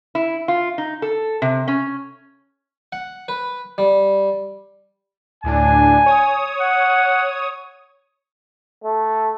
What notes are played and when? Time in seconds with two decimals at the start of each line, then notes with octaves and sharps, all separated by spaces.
0.15 E4
0.48 F4
0.78 D#4
1.02 A4
1.42 C3
1.68 C#4
2.92 F#5
3.28 B4
3.78 G3
5.44 D2 A2 D4 G#5
6.06 C#5 D#6
6.61 F#5
8.84 A3